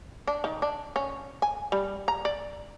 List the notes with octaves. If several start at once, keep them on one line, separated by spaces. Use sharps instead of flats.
D4
D#3
D4
C#4
G#5
G3
A#5
D5